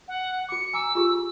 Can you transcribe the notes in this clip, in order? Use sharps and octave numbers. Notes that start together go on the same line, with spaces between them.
F#5
F#4 D6 C#7
G#5 A#5 D6 E6
F4 G4 G#4